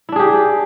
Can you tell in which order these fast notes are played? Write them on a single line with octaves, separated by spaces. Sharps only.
E4 D4 G#4 G4